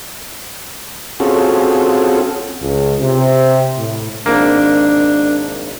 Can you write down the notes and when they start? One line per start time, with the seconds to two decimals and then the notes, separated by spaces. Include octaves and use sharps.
1.20 C4 C#4 F4 F#4 G#4 A4
2.60 C#2
2.99 C3
3.78 A2
4.26 G#1 A#3 D4